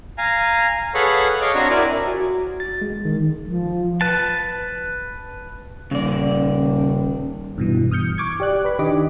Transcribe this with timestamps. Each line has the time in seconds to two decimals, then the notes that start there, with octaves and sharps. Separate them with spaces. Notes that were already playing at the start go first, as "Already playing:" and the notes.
0.18 F5 G#5 A#5
0.94 G#4 A4 B4 C#5 F5 F#5
1.41 C#5 D#5 F5 D6
1.55 C4 D4 F#4 C#5 A#5
1.70 E4 A#4 D5 G#5 D6
2.07 F#4
2.60 A6
2.82 G#3
3.05 D#3
3.48 F3
4.01 B4 A5
5.91 D#1 C#3 D5
7.58 G2 B2 E3
7.91 D#6 F6 G6 C#7
8.18 C#6 D6 G#6
8.40 G4 D5 F#6
8.65 B4 B5
8.79 D#3 D4 G4 D#5 D6